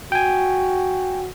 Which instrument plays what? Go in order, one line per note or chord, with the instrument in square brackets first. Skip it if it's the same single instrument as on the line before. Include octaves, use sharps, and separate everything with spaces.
[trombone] F#4 [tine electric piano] G5 G#5